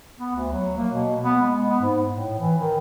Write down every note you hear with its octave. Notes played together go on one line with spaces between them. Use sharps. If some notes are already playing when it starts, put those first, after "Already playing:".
B3
D2
F#3
A#3
B2
B3
G#3
B3
G#2
A2
E3
D#3